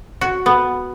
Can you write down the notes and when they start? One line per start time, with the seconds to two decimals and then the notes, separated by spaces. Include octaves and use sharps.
0.21 F#4
0.46 B3